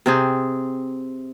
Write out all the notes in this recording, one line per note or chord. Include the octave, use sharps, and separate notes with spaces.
C3 C4 G#4